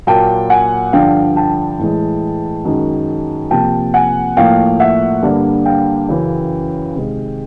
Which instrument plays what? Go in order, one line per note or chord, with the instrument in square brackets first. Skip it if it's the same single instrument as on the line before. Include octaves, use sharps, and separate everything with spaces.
[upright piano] A#2 F#3 A#3 G5 A5
F#5 G#5
G2 D3 F3 F5 G5
G5 A5
A2 E3 G#3
F#2 D#3 G#3
C3 F3 A#3 G5 A5
F#5 G#5
A2 F3 A#3 F5 G5
E5 F#5
G2 D3 G3 A#3
F5 G5
F#2 C#3 E3
C3 D#3 G#3